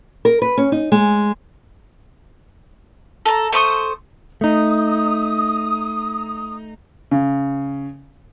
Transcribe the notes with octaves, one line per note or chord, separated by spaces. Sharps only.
A#4
B4
C#4
D#4
G#3
A4 A#5
A3 C5 C#6 D#6
A3 D#4 D#6
C#3